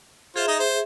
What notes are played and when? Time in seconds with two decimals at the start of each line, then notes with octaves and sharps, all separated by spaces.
0.36 F4 G#4 C5 E5
0.47 D#4 D#5
0.59 C5